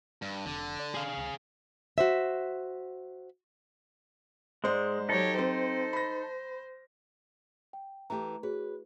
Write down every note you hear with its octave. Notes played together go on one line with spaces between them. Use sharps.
G2
F1 D3
D4
G#4 F5
C#2
F#4 C5 E5
G#2 G#3 C5 D5
F#3 D#4 G4 A4 C#5
C4 C5
B5 A#6
G5
E3 A3 G4 A#5
F#4 G#4 B4 C#5